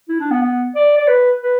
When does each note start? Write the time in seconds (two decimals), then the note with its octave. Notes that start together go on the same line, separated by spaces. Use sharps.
0.09 E4
0.20 D4
0.31 B3
0.42 B3
0.76 D5
0.97 D5
1.08 B4
1.42 B4